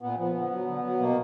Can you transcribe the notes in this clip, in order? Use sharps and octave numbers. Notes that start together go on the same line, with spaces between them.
A#2 B3
F3 B3
D3
F#3
D3
F#3
B2 A#3